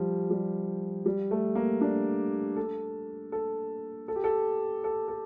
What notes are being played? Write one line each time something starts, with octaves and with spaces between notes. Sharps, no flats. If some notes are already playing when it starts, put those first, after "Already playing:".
Already playing: F3 G3
G3
G3
A3
A#3
D4
A4
A4
A4
G4
A4
A4
A4